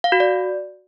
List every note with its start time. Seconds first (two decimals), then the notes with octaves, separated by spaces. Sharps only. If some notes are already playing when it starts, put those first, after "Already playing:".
0.04 F5
0.12 F#4
0.20 D5